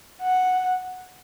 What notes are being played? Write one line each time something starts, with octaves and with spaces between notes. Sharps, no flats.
F#5